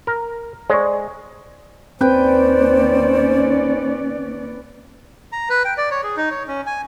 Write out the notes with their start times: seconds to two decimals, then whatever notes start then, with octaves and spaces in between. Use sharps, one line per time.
0.07 A#4
0.70 G#3 C5 D5 C#6
2.01 D#2 C4 C#4 B4 C5 D5 G5
5.32 A#5
5.49 B4
5.65 G5
5.78 D5
5.91 C#5
6.03 G#4
6.17 D#4
6.31 C#5
6.47 C#4
6.66 G#5